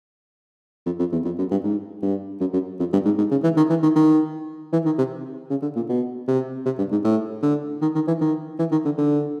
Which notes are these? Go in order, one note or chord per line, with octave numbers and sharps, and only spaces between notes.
F2
F2
E2
F2
F#2
G2
G#2
G2
F#2
F#2
F2
G2
G#2
G#2
C#3
E3
D#3
E3
D#3
D#3
E3
D#3
C3
C#3
D3
A#2
B2
C3
C3
G2
G#2
A2
D3
D#3
D#3
E3
D#3
E3
D#3
D3
D3